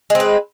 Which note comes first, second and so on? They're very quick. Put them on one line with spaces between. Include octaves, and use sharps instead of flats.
G#3 C4 B4